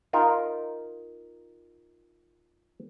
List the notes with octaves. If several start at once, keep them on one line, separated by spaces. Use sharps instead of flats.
D#4 F4 A#4